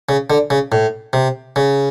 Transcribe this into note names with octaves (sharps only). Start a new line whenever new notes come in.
C#3
D3
C#3
A2
C3
C#3